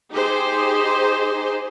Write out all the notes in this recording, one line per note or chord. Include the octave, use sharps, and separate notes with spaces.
D#4 G4 G#4 C5